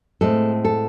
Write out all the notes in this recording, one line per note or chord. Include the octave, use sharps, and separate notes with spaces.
A2 G#3 C4 A4
A4